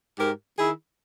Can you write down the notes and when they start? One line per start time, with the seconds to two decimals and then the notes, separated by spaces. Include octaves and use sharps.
0.18 G#2 G4 A#4
0.58 D#3 E4 G#4